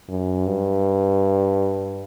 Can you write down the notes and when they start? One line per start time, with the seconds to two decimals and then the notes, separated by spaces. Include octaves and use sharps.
0.09 F#2
0.47 G2